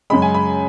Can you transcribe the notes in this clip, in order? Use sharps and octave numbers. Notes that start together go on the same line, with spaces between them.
F#2 C#3 G#3 B5
G#5
B5